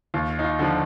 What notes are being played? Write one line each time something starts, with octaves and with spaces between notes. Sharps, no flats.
D#2 F4
D#4
F4
D3 F3